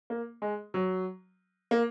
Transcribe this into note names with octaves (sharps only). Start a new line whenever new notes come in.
A#3
G#3
F#3
A#3